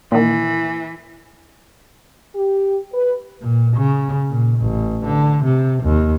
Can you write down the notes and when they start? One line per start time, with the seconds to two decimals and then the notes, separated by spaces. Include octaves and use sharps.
0.12 A#2 D#3 E3
2.35 G4
2.93 B4
3.42 A#2
3.77 C#3
4.30 A#2
4.60 A1
5.05 D3
5.44 C3
5.83 D#2